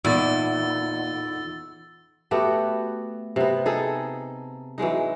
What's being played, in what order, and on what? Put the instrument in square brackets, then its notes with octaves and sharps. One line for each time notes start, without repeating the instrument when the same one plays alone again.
[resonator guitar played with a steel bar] E2 [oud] A#2 [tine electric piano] D#4 F4 [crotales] E6 A6
[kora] A3 B3 F#4 G4
C3 B3
D#4 G#4 A4
E3 F#3 G#3 D#4